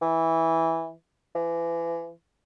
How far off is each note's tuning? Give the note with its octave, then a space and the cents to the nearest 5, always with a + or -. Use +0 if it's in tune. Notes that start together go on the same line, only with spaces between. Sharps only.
E3 -10
E3 +30